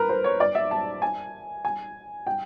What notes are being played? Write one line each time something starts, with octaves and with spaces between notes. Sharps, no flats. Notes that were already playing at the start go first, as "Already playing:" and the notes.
Already playing: A#4 B4
C5
C#5
D5
E5
A5
G#5
G#5
G5